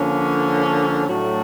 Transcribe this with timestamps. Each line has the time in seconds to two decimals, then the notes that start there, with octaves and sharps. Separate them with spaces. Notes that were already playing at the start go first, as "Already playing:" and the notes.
Already playing: D3 F3 A#3 C#4
1.09 A2 F#3 A3 D4 F#4